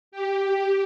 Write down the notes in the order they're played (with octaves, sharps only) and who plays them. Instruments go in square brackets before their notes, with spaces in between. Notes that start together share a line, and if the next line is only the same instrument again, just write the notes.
[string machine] G4